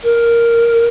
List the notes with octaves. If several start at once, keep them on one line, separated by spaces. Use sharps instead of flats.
A#4